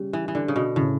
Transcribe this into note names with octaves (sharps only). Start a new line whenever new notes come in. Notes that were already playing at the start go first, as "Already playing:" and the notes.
Already playing: C#3 G3
E3
E3
D3 D4
C#3
B2
A2 C#3